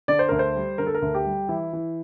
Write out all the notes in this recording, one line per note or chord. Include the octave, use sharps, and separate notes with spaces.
D3 D5
C5
D2 A#4
C5
G3
D3 A#4
A4
A#4
D2
G4
G3
E3 E4
E3